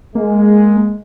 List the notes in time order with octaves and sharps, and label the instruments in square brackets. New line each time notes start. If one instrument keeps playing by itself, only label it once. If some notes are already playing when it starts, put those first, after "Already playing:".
[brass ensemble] G#3 [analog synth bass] A#3